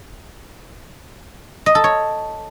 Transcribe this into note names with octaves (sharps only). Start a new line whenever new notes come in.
D#5
A4
C#5